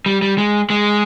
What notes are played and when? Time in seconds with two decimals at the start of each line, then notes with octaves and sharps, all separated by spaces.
0.06 G3
0.22 G3
0.38 G#3
0.70 G#3